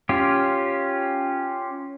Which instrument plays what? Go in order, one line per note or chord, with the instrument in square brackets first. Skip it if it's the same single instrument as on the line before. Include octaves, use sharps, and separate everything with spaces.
[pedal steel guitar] C#4 F4 G4